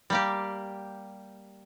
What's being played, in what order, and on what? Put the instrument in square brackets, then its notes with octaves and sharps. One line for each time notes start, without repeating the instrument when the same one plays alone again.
[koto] G3 A#3 G4